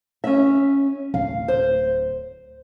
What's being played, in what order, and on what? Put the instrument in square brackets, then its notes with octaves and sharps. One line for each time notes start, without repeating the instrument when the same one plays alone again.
[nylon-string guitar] C#4 E5
[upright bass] D1 [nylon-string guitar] F5
[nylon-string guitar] C5